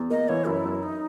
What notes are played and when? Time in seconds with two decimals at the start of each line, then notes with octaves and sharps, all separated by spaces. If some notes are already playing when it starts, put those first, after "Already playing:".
Already playing: E2
0.10 A#3 D#5
0.28 E3 C#5
0.47 F#2 E4
0.65 F#2
0.83 D#4